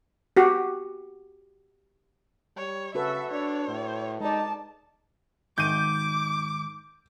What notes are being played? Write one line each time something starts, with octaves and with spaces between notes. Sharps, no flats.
F#4 G4
G3 C#5
C#3 F#4 A4 B4 E5
D4 C#5
A2
G#3 D#4 D5 A5
G#2 D#3 D6 G6 D#7